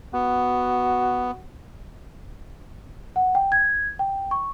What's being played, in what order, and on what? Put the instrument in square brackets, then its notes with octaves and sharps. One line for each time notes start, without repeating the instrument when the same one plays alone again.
[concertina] B3 [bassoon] F#4
[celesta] F#5
G5
G#6
G5
C#6